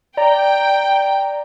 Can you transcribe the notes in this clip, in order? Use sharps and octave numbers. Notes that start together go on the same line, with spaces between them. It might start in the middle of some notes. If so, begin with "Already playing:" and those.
D5 G5 A#5